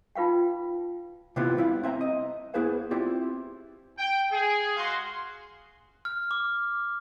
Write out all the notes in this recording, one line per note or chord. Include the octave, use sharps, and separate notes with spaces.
D#4 F4 B4 F5 G5
C3 E3 B3 C4 E4 F4
G3 E4 F5
C4 E5 G5 A#5
D#5
B3 E4 G#4 B4 C5 F5
C4 E4 F4 G4 D5
G5
G#4
G#3 F#4 F5 C6
F6
D6